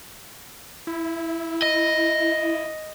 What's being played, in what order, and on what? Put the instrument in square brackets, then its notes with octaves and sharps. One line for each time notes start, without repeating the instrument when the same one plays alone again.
[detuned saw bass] E4
[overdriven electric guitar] D#5